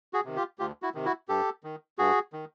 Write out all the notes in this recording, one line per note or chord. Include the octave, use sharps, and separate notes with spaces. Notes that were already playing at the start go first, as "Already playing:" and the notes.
F#4 G#4
C3 D#3
F4 G4
D2 F4 G4
E4 F#4
C3 D#3
E4 F#4
G2 G4 A4
D#3
G2 F#4 G#4
D#3